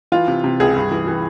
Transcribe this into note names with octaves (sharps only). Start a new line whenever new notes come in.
E3 F4
C3
C3
C#2 G#4
G2
E3
E3